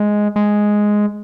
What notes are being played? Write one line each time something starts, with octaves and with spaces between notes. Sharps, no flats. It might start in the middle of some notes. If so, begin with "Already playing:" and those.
Already playing: G#3
G#3